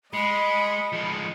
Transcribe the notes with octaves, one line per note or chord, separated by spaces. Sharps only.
G#3 D#5 B5 C#7
F3 G#3